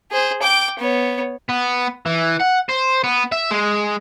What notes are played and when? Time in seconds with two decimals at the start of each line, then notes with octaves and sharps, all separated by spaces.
0.11 G#4 C5
0.42 G5 D6
0.79 B3 C#5
1.50 B3
2.06 E3
2.41 F#5
2.69 C5
3.04 B3
3.32 E5
3.51 G#3